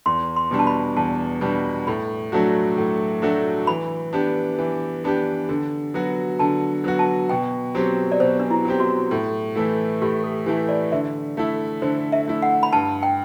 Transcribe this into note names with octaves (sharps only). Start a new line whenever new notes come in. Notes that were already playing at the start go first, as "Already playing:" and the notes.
E2 C6
C6
B2 G3 D4
A5
B5
E2 A5
B2 G3 D4
A2 B5
F#3 A3 D4 F#4
A2
F#3 A3 D4 F#4
E3 B5
B3 D4 G4
E3
B3 D4 G4
D3
F#3 B3 F#4
D3 A5
F#3 B3 F#4
A5
B2 G5
F#3 C4 G4
D5
B2 C5
D4
E4
F#3 C4 G4
F#4
A2
E3 A3 E4
A2 G4
A4
E3 A3 E4 G4
D5
D3 E5
A3 E4
D3 C5
E5
A3 E4
F#5
B5
G2 A5
G5